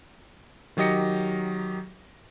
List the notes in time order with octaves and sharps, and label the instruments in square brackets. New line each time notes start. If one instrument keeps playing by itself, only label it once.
[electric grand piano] D#3 F#3 G4 D#5 A#6 C#7